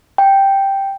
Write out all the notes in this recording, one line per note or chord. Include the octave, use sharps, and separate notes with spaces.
G5